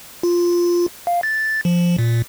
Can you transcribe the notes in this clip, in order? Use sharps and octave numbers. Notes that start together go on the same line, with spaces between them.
F4
F5
A6
F3
A#2